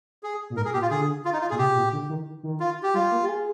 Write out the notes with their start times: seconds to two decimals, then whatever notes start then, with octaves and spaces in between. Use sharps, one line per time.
0.23 G#4
0.50 A#2
0.57 G#2 A#4
0.65 G#4
0.74 A#2 G4
0.82 F4
0.90 D3 G#4
1.25 F4
1.33 D#4
1.41 F4
1.50 A#2 G#4
1.58 C3 G4
1.76 A#2
1.93 D3
2.09 D#3
2.43 D#3
2.60 F4
2.83 G4
2.94 G3 F4
3.11 A#3
3.23 G4
3.28 G#4